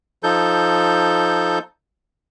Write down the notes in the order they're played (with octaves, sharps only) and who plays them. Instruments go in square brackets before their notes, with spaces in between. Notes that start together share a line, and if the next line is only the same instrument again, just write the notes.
[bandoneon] F3 D#4 A4 G6